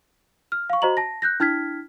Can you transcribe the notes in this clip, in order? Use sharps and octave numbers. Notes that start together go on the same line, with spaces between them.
F6
F5 C#6
F#4 C5 D#5 A#5 F#7
A5 A#6
F#6 G6 A#6
D4 E4 F6 G#6 B6